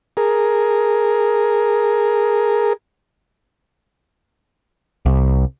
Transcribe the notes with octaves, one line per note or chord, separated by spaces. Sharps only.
G#4 A#4
C2